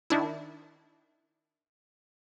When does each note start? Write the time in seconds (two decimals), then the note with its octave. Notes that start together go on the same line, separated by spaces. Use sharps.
0.10 D#3 D4 E4